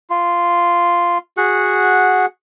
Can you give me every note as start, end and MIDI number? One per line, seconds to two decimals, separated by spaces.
0.10 1.18 65
1.37 2.26 66
1.37 2.26 68
1.37 2.26 78